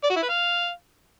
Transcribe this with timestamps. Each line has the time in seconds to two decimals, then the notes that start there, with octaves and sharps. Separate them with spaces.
0.04 D5
0.10 F#4
0.16 E4
0.23 B4
0.29 F5